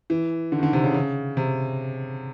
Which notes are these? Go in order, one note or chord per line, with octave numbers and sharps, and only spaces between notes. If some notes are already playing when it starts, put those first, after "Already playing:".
E3
D3
D#3
D3
C3
C#3
C#3
C3